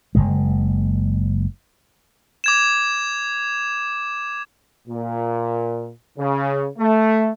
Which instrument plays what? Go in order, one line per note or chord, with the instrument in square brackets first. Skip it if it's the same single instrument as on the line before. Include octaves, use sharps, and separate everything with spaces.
[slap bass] F#1 E2 G#3
[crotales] D6 G#6 E7
[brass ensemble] A#2
C#3
A3